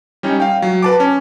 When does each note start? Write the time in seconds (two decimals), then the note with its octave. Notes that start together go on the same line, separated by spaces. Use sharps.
0.23 G3 C#4 D#4
0.40 F5 G5
0.62 F#3
0.82 B4 A5 D6
1.00 C#4